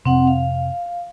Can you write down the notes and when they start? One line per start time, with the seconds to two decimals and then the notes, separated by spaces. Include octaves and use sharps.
0.05 F1 C3 C4 F#5
0.27 F5